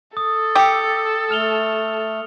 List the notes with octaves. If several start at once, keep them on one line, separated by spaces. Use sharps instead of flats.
A4 D#6
G4 E6 C#7
A3 F6 F7 G7